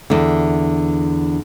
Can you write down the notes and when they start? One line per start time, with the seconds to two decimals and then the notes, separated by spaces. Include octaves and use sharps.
0.10 E2 D3